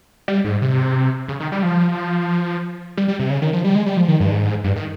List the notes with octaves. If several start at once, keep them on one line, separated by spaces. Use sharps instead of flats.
G3
G#2
C3
C#3
D#3
G3
F3
G3
G3
C3
C#3
D#3
F3
G3
G#3
G3
F3
D#3
G2
G#2
G2
D#3